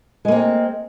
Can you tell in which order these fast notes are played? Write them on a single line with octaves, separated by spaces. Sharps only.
G#3 A#3 C4